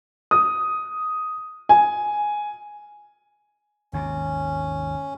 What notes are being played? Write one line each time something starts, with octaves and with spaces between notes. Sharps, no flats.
D#6
G#5
G#1 D#2 C3 C#4